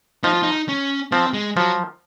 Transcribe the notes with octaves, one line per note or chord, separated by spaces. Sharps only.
F3 D#4
F4
D#4
C#4
F3 C4
G#3
F3 F#3